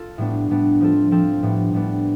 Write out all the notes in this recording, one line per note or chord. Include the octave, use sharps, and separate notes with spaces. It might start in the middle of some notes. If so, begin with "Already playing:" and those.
Already playing: F4 A4
A2 G3 B3 D4
A2 G3 B3 D4
F3 C4 F4 A4
F3 C4 F4 A4
A2 G3 B3 D4
A2 G3 B3 D4